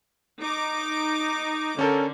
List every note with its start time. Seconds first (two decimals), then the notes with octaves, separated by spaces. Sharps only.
0.41 D#4 D6
1.79 D3 C#4 A4 A#4